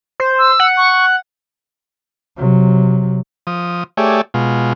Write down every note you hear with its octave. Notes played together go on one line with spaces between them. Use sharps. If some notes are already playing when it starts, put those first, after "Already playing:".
C5
E6
F#5
C#6
C3 F#3
F3 D#6
A3 G4 G#4 C#5 D5 E5
B2 G#3 F4